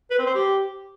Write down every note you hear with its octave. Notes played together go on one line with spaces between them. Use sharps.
B4
C4
C5
G4